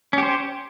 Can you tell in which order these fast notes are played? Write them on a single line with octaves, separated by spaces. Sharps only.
C#4 G4 C5